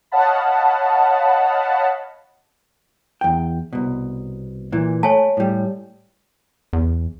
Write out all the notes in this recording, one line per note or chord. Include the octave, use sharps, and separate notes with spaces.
C#5 D#5 F5 F#5 A5 B5
E2 G5
C2 B2
A#2 E3
A3 C#5 G#5 A5
A2 G3
E2